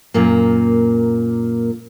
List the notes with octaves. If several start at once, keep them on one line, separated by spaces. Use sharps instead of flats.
F#2 A#2 A#3